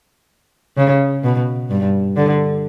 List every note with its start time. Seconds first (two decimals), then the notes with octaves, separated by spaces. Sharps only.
0.77 C#3
1.24 B2
1.70 G2
2.16 D3